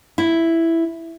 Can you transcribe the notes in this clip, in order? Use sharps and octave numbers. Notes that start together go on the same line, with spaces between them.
E4